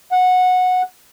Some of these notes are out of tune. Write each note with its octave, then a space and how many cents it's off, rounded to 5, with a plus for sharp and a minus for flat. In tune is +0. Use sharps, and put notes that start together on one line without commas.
F#5 -15